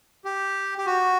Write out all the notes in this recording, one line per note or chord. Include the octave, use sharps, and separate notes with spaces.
G4
G4
F#4